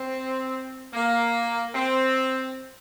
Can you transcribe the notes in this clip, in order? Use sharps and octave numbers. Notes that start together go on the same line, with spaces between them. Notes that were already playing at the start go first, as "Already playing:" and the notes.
Already playing: C4
A#3
C4